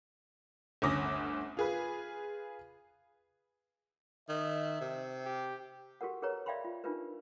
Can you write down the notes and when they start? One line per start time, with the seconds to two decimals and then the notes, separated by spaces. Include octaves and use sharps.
0.82 G1 D2 C#4 D6 D#6 A#6
1.57 F4 G#4 B4
4.29 D#3 E5
4.81 C3
5.25 G4
6.01 F#4 G4 A4 A#4 F#5
6.22 G4 G#4 A#4 B4 C#5 A#5
6.46 D5 E5 F5 G5 B5 C6
6.65 F4
6.84 D4 D#4 F4 G4 A#4 B4